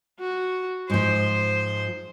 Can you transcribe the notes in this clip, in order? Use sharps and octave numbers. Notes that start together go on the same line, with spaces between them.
F#4
G#2 F3 C5